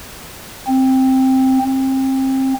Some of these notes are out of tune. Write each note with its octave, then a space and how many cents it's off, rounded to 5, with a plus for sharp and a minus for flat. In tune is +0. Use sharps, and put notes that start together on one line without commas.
C4 +5
C4 +25